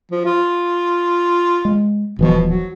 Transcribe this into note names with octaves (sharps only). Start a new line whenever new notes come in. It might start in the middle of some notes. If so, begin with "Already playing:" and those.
F3
F4
G#3
D#1 B2 E3 F3
F#3